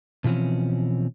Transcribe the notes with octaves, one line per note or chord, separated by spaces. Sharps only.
B2 E3 F3 C4 C#4